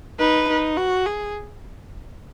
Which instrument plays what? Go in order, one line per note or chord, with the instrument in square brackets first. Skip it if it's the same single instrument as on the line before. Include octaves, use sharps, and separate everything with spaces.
[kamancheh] D#4 [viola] B4
[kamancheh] D#4
F#4
G#4